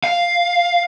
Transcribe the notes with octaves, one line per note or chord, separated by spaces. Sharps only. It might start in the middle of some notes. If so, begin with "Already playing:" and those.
F5